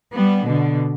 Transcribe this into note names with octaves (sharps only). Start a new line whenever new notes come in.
G3 B3
B2 D3